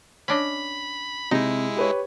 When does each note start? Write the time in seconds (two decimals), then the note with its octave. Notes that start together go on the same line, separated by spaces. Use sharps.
0.28 C#4 D4 D#5 B5
1.31 C3 G#3 D#4 E4
1.76 G4 B4 C#5